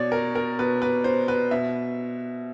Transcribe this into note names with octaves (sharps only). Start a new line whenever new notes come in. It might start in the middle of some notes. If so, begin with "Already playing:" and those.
Already playing: B2 C#5 D5
A#4
A#4
B2 B4
B4
C5
B4
B2 E5